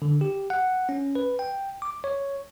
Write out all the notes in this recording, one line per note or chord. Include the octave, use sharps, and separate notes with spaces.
D3
G4
F#5
C#4
B4
G5
D6
C#5